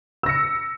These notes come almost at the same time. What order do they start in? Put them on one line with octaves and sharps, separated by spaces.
E6 A#6 C#7